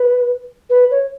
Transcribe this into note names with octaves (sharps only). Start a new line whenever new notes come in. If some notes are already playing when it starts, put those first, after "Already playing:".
Already playing: B4
B4
C#5